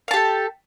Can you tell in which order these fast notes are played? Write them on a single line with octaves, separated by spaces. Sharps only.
F5 A5 G4 A4